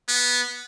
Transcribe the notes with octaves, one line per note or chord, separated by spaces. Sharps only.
B3